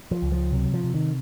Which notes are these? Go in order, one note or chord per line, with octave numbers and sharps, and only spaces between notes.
F3
C#2
F3
C3 F#3
F3
C3
D#3